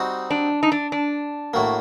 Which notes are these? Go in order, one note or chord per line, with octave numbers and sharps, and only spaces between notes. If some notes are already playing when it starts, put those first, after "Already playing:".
Already playing: G3 C4 D#4 F#4
D4
D#4
D4
D4
A2 F#3 A#3